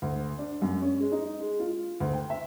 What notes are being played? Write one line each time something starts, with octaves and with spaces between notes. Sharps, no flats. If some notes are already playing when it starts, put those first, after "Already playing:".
D2
D4
F#2
C#4
G#3
D#4
G#3
F4
D2
G5
E5